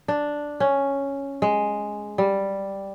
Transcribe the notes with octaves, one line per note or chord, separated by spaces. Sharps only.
D4
C#4
G#3
G3